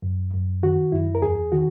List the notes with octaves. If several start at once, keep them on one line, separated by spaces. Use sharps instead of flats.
F#2
F#2
D#3 F#4
F#2 E4
A#4
E2 G#4
D#3 F#4